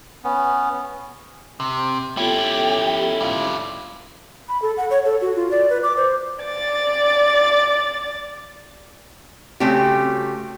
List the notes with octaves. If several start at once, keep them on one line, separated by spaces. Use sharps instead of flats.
B3 C#4
C3
B3 C#4 E4 F4 G4 A4
G3 F4
B5
A4
F#5
C#5
A4
F#4
F4
D5
B4
D6
C5
D5 A6
C#3 G3 A3 C4 F#4 G4